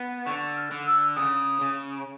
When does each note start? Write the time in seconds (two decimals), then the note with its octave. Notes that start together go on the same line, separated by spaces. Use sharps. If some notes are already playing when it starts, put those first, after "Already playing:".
Already playing: B3
0.26 D3 C#6
0.57 F6
0.72 D3
0.87 E6
1.16 C#3 D#6
1.61 C#3